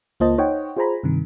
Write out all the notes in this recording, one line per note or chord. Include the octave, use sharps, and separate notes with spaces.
C#2 A#3 F4 C5 D#5 A5
D#4 C5 C#5 D#5 F#5 G5
F4 G#4 C5 G#5 A#5 B5
G2 C3 D#3